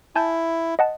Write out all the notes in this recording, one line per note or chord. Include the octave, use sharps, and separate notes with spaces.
E4 G#5 A5 G6
D#5 F#5 A5